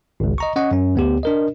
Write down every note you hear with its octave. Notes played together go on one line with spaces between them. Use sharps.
G#1 C#2
D#5 A#5 C#6
C#4 D#5 F#5 C#6
F#2 C#4
D2 B3 G4
D4 A#4 D#5